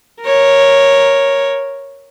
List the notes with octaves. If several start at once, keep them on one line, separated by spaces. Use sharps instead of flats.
A#4 C#5